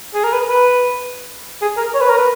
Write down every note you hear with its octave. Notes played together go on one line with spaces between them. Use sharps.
G#4
A#4
B4
B4
G#4
A#4
C#5
B4
A#4
B4